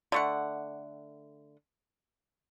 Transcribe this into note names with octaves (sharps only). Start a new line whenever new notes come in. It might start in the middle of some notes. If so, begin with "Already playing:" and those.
D3 A3 F#5